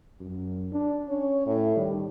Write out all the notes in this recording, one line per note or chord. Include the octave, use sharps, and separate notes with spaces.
F#2
D4
C#4 C#5
A2
D#3 G3